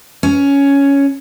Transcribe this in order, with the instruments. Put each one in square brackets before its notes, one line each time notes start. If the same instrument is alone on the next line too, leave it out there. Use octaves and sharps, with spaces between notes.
[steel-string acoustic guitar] C#4